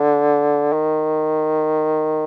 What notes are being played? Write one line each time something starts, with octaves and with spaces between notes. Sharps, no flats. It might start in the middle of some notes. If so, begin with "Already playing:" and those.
Already playing: D3
D#3